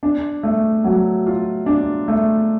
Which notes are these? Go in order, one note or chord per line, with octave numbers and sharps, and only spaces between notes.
D4
A3
F#3
F4
D4
A3